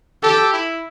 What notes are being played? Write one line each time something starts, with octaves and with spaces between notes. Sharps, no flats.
G4 A4
E4